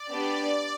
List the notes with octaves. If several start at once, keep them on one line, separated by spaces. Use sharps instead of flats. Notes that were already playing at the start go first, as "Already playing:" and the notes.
Already playing: D5
B3 D4 G4